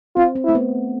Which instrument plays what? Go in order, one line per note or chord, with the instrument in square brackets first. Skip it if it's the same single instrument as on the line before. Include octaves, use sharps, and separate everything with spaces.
[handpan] C4 [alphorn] F4
[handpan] C4
[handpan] A3 [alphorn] E4
[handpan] B3